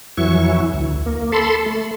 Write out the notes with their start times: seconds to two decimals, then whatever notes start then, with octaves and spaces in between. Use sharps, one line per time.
0.17 F2 E3 F#3 E4 C#6
0.74 D2
1.06 A#3
1.32 A4 A5 B5 C6
1.66 A3